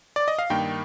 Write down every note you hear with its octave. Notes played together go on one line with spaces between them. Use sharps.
D5
D#5
F5
G2 D#3 A#3 D#4 G5